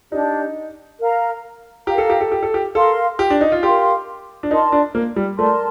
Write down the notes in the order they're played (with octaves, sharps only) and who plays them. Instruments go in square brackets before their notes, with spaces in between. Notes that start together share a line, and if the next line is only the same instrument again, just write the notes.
[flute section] D4 G4 D5 [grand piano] D#4
[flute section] A#4 F5 A#5
[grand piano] G4 [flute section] A#4 F5 A#5
[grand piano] A4
G4
A4
G4
A4
G4
[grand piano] A4 [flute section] A#4 F5 C6
[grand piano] G4
D4
D#4
F4
[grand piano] G4 [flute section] A#4 F5 C6
[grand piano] D4
[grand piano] D#4 [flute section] A#4 D5 A5 C6
[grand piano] D4
A#3
G3
[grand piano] A3 [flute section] A#4 D5 A5 C6